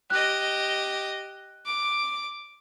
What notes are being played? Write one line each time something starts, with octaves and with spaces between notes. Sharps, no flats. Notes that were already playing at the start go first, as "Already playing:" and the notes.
G4 D#5 F#6
D6